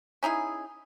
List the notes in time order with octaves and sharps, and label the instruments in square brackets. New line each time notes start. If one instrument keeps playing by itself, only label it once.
[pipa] C#4 D#4 E4 G#4